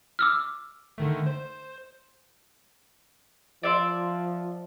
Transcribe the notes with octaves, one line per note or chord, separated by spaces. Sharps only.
D6 E6 F6
D3 D#3 A3
C5
F3 D5 E5 C6